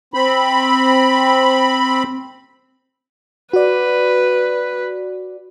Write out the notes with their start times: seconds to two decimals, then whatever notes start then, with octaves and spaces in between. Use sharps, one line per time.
0.14 C4 B5
3.53 F#4 B4 D5